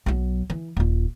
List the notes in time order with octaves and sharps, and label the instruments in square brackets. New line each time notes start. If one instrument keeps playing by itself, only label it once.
[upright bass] B1 F#3
E3
D#1 F4